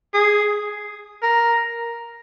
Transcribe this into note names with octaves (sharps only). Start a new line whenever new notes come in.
G#4
A#4